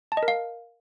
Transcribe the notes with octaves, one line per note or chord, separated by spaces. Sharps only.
A5
D#5
A#4
F5